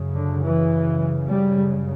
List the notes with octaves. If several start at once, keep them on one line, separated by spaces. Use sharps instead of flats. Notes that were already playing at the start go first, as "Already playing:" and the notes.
Already playing: F#2 C#3
D3
E3
G3